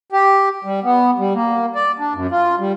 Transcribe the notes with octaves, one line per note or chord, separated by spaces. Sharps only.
G4
G3
B3
G3
A#3
D5
D4
F#2
F4
G3